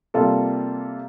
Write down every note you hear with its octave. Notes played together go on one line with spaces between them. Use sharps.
C3 G3 A#3 F4 A4